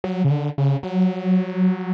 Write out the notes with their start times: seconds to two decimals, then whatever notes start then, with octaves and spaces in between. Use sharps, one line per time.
0.04 F#3
0.24 C#3
0.31 D3
0.58 C#3
0.83 F#3